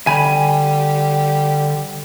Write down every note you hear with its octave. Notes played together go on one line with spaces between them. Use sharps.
D3 G3 G#5 B5